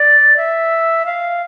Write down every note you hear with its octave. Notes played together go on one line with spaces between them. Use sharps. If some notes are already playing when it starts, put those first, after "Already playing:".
Already playing: D5
E5
F5